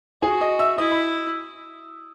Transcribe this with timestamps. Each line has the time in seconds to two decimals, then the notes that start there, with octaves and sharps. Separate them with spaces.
0.22 F#4 G#4 G#5
0.41 D#5 D#6
0.59 E5 E6
0.78 E4 D#5 D#6
0.91 B5